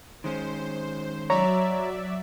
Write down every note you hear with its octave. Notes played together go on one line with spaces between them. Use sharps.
D#3 G#3 C#4 C5
F#3 C#5 D5 E5 A#5